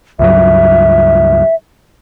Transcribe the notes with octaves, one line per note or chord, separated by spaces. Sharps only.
C#2 G2 F#3 E5